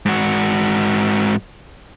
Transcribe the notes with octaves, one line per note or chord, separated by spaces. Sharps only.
G#2 F#4